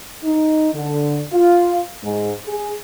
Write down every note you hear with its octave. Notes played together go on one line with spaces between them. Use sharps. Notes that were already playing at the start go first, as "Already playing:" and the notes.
D#4
D3
F4
G#2
G#4